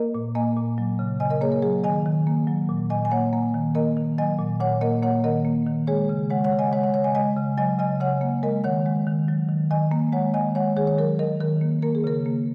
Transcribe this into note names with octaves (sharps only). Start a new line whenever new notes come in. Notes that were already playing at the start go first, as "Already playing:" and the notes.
Already playing: A#3 A#4 D#5
A#2
A#3 D#5 G#5
A#2
F#3
C#3
C#3 D#5 G#5
A#4 D#5
A#3 G#4 C#5
A#4
F#3 G#4
D#3 D#5 G#5
D#3
A#3
F#3
A#2
A#2 D#5 G#5
G#5
A#3 C#5 F#5
A#3
D#3
A#3 A#4 D#5
D#3
F#3 D#5 G#5
A#2
A#2 C#5 F#5
A#3 A#4 D#5
A#3 C#5 F#5
D#3 A#4 D#5
A#3
D#3
G#3 G#4 C#5
C#3
G#3 C#5 F#5
C#5 F#5
C#3
D#5 G#5
G#3 C#5 F#5
C#5 F#5
C#3 C#5 F#5
D#5 G#5
G#3 D#5 G#5
C#3
F#3 D#5 G#5
C#3 D#5 G#5
C#3 C#5 F#5
A#3
G#3 A#4 D#5
D#3 C#5 F#5
G#3
D#3
F#3
D#3
D#3 D#5 G#5
A#3
G#3 C#5 F#5
D#3 D#5 G#5
G#3 C#5 F#5
D#3 G#4 C#5
C#5
F#3 A#4
D#3 A#4 D#5
D#3 A#4
A#3
A#3 A#4
G#4
C#3 A#4
A#3